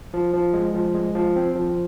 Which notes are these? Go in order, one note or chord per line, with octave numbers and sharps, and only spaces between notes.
F3
F3
G#3
F3
G#3
F3
C4
F3